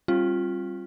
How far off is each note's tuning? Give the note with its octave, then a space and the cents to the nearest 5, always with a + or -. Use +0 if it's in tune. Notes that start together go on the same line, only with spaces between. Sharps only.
G3 +0 C4 +45 F4 +0